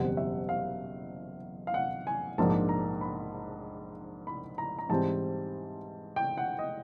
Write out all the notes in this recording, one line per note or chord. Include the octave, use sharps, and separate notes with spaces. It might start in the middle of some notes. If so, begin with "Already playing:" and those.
Already playing: F#1 E2 B2 G3 C4 F#5
E5
F5
F5
F#5
G#5
A#1 G#2 F3 A#3 D4 A5
A#5
B5
B5
A#5
A#5
G#2 E3 G3 C4 A5
G5
F#5
D#5